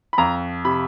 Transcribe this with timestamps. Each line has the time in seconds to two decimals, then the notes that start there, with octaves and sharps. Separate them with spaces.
0.13 B5
0.18 F2 A#5
0.65 C3 B5